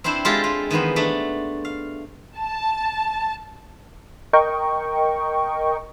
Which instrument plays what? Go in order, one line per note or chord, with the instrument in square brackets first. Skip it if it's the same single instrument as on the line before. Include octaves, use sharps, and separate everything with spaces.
[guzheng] C4 D4 E4 C5
G#3 F4 G4 A4
F4
D#3 E3 B3 C5
A3 D4
F5
[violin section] A5
[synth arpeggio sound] A#4 D#5 G5 C#6